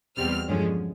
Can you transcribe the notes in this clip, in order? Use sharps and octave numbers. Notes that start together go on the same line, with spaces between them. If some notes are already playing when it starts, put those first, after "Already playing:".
E2 B2 G3 C4 F6
G2 D3 F3 G#3 C#4